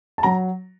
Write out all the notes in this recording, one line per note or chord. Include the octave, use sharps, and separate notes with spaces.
A5
F#3 A#5